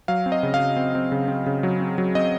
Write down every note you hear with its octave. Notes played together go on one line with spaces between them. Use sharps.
F#3 F5
C4
D#5
C#3
F5
C#3
C4
C4
C#3
C4
C#3
F#3
C4
F#3
C4 D#5